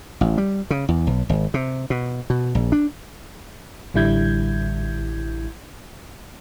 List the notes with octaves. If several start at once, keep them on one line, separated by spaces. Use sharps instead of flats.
A1
G3
C#3
E2
B1
G#1
C3
B2
B2
A#1
D4
A1 D3 G3 E4 G6 G#6